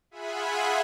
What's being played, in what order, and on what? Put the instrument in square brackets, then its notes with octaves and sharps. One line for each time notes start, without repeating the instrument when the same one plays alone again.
[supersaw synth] F4 G#4 E5 F#5 G#5 B5